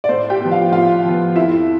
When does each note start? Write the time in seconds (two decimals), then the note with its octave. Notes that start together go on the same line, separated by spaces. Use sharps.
0.04 D5
0.09 A2 C5
0.30 G4 G5
0.40 F3 B3
0.51 F4 F5
0.72 A2 F4 F5
1.04 F3 B3
1.36 F2 E4 E5